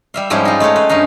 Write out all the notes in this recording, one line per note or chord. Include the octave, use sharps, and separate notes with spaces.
G3 E5 F5
G#2 F3 G3 G#3 C#4 E4
D#4 F4
G#3 A3 G#4 C#5 F5
B4
G2 C#4 D#4 F5